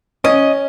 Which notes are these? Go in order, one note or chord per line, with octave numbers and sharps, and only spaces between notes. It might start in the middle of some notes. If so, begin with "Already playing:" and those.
C#4 D#5